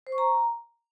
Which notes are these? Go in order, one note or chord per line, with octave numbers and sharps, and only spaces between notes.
C5
C#6
A#5